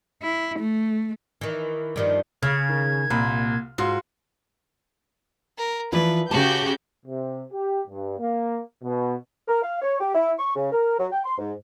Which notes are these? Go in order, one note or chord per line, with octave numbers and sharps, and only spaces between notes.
E4
A3
D#3 E3
G2 D#3 F3
C#3 F6 G#6
D#3
C2 A#2 B5
G#2 F4 F#4 C6
A#4
E3 F3 B4 D5
C#3 F#4 G4 A5 G6
C3
G4
G2
A#3
B2
A#4
F5
C#5
G4
E4
C#6
C#3
A#4
F#3
G5
C6
G#2